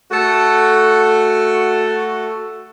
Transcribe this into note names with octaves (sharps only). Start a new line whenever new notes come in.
A3 F#4 A4